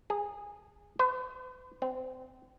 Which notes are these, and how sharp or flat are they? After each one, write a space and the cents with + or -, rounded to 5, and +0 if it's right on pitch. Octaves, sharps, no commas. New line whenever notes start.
G#4 -20
B4 +45
C4 -30